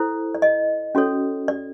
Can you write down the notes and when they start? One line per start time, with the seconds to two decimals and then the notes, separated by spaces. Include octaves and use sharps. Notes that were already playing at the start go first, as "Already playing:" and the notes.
Already playing: E4 A4 C5
0.35 D5
0.42 D#5
0.95 C#4 F#4 A4 C#5
1.48 D5